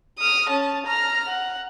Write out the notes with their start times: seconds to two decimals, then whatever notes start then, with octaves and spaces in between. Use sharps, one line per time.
0.19 D#6 F6
0.49 C#4 A5
0.86 A#5 F6
1.29 F#5